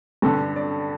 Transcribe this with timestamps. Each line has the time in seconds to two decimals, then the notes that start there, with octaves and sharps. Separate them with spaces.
0.22 G2 D3 A4
0.56 D5